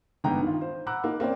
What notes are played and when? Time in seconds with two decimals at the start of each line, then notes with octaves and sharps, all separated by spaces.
0.24 G1 G#2 B3 G5 A#5
0.43 D#3 F4
0.61 C5
0.87 F#5 A#5 B5 D6 E6 F#6
1.04 A#3 D#4
1.20 A#3 C4 C#4 D5